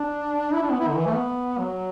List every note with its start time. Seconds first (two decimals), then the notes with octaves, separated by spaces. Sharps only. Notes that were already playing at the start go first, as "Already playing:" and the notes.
Already playing: D4
0.53 E4
0.62 D4
0.71 B3
0.80 E4
0.88 D3
0.97 E3
1.06 A3
1.15 B3
1.58 F#3